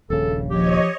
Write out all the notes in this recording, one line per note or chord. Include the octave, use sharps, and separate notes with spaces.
D#1 A#1 C#3 A4
F3 G4 C#5 D#5